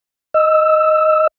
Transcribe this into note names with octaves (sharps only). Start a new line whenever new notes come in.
D#5 E6